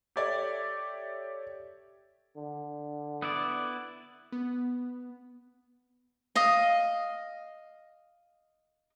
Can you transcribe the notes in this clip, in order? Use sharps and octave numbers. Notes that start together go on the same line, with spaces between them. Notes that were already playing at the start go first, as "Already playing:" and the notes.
G4 A4 C#5 D5 E5
D3
B3 E4 D5
B3
D#5 F5